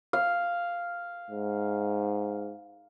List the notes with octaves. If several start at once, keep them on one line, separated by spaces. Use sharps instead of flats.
F5
G#2